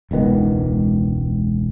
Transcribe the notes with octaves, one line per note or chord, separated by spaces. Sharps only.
E1 C#2 D#3 B3